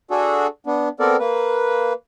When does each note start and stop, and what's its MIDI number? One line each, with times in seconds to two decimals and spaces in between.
0.11 0.47 62
0.11 0.47 66
0.11 0.47 68
0.11 0.47 69
0.67 0.89 59
0.67 0.89 62
1.00 1.16 59
1.00 1.16 60
1.00 1.16 69
1.00 1.16 70
1.00 1.16 74
1.19 1.93 58
1.19 1.93 71